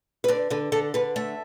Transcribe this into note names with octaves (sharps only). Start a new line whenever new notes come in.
B4
D3 D5
D3 B4
D3 A4
D3 B4
A3 E5